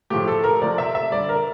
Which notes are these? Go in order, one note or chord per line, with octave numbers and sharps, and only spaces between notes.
A2 F3 A3 G4
A4
A#4
C3 F3 A3 D5
E5
E5
D3 G3 D5
A#4